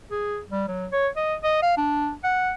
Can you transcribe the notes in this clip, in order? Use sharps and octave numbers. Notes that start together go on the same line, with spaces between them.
G#4
G3
F#3
C#5
D#5
D#5
F5
D4
F#5